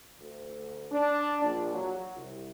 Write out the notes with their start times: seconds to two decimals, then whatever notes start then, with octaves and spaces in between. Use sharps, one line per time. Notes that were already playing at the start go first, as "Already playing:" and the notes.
0.20 D2
0.92 D4
1.43 A#1
1.74 F#3
2.15 C2